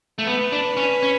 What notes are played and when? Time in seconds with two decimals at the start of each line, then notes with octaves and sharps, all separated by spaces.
0.18 A3
0.27 B3 B4
0.52 D4
0.77 C#4
1.03 C#4